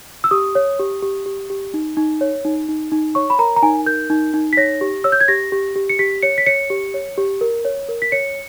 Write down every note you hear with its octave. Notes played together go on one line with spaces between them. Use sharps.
E6
G4 D#6
C#5
G4
G4
G4
G4
D#4
D#4
C#5
D#4
D#4
D#4
C#5 C#6
B5
A#4 A#5
A#5
D#4 G#5
A#4 G6
D#4
D#4
B6
C#5 A#6
G4
C#5 E6
G6
G#6
G4 A#6
G4
G4
C#7
G4 B6
C#5 C#7
B6
C#5 C#7
G4
C#5
G4
A#4
C#5
A#4
B6
C#5 C#7